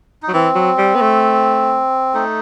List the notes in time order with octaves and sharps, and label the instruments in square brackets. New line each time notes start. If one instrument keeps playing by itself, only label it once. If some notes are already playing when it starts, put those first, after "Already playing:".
[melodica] D#4
[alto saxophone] F#3
[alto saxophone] E3 [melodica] C4
[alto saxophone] F#3
G3
B3
A3
[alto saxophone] A3 [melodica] D#4